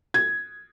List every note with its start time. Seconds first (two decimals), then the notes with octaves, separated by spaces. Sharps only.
0.14 G#6